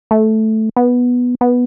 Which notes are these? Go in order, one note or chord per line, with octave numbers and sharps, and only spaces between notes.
A3
B3
B3